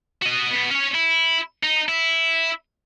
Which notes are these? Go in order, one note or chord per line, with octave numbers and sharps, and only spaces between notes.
F#4 D#5
B2 B3
C#4 C#5
E4
D#4
E4